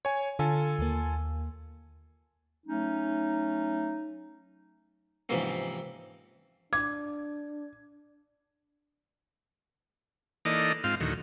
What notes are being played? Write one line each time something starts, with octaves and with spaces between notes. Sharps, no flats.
C#5 G#5
D3 F4 A4 G#5
D#2 A#3
F#3 A3 C#4 D#4
G#2 C3 E3 F3 A#3 C#4
D4 D6 G#6
E3 A#3 D#4 A4 D5 D#5
G#2 C4 F4 F5
D2 A2 D#3 F#3